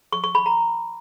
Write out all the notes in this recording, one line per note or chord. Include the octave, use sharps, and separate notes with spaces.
C#6
C#6
B5
A#5